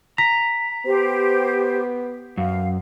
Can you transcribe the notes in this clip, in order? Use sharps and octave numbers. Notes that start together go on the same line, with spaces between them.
A#5 B6
B3 G4 C5
F#2 F5